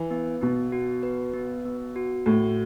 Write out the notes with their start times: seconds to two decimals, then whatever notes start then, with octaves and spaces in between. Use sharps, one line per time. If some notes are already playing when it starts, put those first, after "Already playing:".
Already playing: E3 B4
0.11 B3
0.41 B2 B3
0.72 F#4
1.03 B4
1.34 B3
1.65 B3
1.96 F#4
2.26 A2 F#4